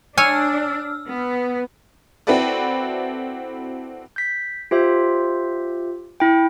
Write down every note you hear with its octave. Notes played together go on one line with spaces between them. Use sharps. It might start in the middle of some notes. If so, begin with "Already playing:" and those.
D4 C#5 G#5 E6 F6
B3
C4 E4 F#4 A4 B4 D5
G6 B6
F4 G4 C5 E5
E4 G5